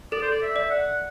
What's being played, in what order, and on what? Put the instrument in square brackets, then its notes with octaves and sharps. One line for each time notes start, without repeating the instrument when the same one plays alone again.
[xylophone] A4 [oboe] D5
[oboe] C5
D5
E5
[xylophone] D5
[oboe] F#5